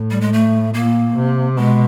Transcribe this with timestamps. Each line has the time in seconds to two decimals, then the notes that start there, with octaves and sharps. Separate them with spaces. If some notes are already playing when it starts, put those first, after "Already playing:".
Already playing: A2
0.11 G3
0.21 G#3
0.33 A3
0.74 A#2 A#3
1.15 C3
1.57 B2 G#3